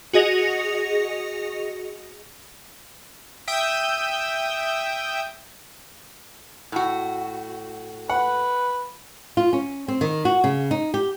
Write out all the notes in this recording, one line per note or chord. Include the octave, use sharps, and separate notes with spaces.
F#4 G#4 D#5 A#6 C#7 F7
E5 G5 D#6 E6 G6
A2 F#4
B4 F#5
F4
C#4
C4
D#3
F#4
C#3
D#4
G4